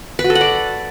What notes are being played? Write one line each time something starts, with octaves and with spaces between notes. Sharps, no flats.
B4
F#4
A4
F#5
D5